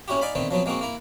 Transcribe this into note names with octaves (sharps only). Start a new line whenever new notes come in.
A2 C#4 E4 F#4 G4
D#4 D5 F5 G#5 B5
D3 D#3 A3 B3 C4
F3 F#3 B3 C4
G#3 A#3 C4 D#4 F#4
A#3 E4 A#5